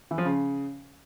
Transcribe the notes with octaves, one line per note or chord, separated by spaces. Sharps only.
E3
F3
C#3